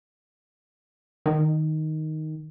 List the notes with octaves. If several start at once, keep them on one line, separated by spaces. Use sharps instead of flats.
D#3